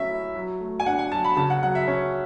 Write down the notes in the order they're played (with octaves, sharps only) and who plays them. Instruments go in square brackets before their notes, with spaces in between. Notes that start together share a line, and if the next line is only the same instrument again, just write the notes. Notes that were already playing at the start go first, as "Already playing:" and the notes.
Already playing: [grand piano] F#3 A3 C#4 [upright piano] E5
[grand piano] E4
F#3
A3
[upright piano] G#5
[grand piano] D4 [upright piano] F#5
[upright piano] G#5
[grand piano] F#3 [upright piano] A5
[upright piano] B5
[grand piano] C#3 [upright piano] A5
[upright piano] F#5
[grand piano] F#3 [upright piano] F#5
[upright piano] E5
[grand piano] C#4